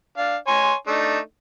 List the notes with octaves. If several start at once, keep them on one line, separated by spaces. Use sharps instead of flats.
D4 F5
C#5 G#5 C6
A3 D4 D#4